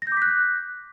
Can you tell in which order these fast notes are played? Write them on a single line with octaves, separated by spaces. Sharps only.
A#6 G6 D6 B6 F#6